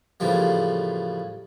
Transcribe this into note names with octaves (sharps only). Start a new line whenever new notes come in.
A2 C#3 E3 F3 G3 A#3